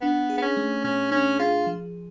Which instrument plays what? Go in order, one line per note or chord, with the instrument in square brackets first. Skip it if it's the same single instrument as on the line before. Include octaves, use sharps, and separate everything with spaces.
[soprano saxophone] B3 [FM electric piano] D4
[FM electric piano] G#4
[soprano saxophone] B3
C#4
[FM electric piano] A3
[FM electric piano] B2 [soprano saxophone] C#4
[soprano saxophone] C#4 [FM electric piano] D4
[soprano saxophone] F4 [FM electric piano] G#4
[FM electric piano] F3